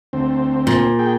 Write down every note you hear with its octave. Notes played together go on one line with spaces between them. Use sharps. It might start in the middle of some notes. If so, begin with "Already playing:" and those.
D2 C4
A#2
G#4 G5